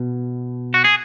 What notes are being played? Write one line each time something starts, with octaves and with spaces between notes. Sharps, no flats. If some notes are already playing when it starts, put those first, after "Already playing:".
Already playing: B2
F#4
G#4